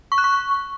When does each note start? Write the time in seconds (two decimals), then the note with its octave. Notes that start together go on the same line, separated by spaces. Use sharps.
0.12 C#6
0.18 F#6
0.24 C#6